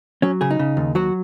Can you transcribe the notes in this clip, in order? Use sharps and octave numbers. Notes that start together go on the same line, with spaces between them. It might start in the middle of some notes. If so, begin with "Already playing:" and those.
F#3 C#4
C#3 G#4
D#4
C#3
D#2
F#3 F#4